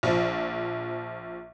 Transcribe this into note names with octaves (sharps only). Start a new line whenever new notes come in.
A#1 F3